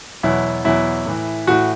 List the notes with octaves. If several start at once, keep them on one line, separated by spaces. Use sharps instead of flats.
E2 B2 F#3 E4
E2 B2 F#3 E4
A2 E3
A2 E3 F#4